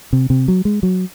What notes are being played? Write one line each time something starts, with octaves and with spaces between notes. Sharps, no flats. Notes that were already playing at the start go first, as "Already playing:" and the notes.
C3
C3
F#3
G#3
F#3